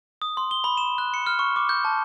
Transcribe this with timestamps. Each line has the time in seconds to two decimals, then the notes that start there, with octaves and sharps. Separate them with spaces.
0.22 D#6
0.37 C6
0.51 G7
0.64 B5
0.77 E7
0.98 F#6
1.14 C#7
1.26 F6
1.39 C#6
1.56 D6
1.69 G6
1.85 A5